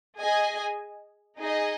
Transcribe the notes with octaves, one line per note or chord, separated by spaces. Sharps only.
G#4 D#5 G#5
D#4 G#4 D#5